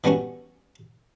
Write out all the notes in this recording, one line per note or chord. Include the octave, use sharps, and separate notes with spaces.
E3 G3 B3 C#4 F#4